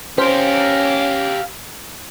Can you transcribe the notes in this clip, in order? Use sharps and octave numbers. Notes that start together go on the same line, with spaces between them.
C#4 G4 A#4 C5 F5